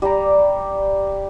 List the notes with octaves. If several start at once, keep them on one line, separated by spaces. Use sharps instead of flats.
G3 G4 D5 A#5